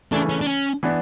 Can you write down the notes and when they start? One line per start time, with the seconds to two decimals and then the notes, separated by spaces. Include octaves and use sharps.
0.12 C#3 E3 A3 D4
0.29 C#4
0.41 D4
0.46 C#4
0.83 E3 B3 D4